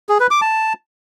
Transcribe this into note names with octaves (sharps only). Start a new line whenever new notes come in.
G#4
B4
D6
A5